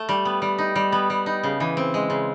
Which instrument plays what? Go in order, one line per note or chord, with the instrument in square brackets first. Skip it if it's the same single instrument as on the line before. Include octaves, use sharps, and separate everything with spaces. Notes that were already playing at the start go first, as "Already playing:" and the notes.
Already playing: [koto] A3
G3
B3
G3
D#4
G3
B3
G3
D#4
C#3
E3
C4
G#3
C#3